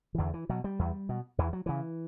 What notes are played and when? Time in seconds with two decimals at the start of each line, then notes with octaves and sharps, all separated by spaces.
0.15 E3
0.18 E2 D3
0.34 E3
0.49 B2 F#3
0.64 G3
0.79 E2
1.09 B2
1.38 E2 E3
1.53 F#3
1.66 C#3 E3